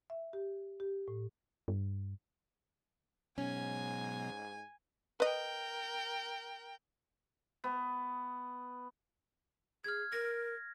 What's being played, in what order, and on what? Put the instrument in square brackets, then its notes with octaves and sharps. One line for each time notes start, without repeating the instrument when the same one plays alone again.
[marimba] E5
G4
G4
A2
[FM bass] G2
[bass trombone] G#2 [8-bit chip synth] B2 F#3 B3 [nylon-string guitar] C#4 [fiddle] G#5
[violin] A#4 G5 [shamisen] B4 D#5
[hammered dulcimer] B3
[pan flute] G#4 [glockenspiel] F6 G#6
[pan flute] A#4 [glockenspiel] A#6